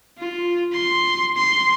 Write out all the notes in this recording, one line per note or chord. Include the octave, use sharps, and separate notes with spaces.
F4
C6
C6